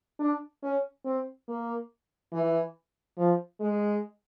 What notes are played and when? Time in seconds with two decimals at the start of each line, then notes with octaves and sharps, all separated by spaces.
0.20 D4
0.63 C#4
1.05 C4
1.48 A#3
2.33 E3
3.18 F3
3.60 G#3